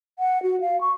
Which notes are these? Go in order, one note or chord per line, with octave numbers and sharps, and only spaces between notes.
F#5
F#4
F5
C#6